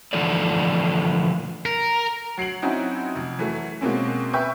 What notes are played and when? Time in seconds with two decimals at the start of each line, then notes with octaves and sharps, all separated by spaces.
0.13 D3 E3 F3 A3 A4 D5
1.66 A#4
2.38 F#3 C7 D7 F#7
2.62 F#3 C4 C#4 D#4 E4 F#4
3.16 F1
3.39 E3 F#3 A3
3.81 B2 G#3 A#3 C4 C#4
4.33 B4 E5 G5 B5 C#6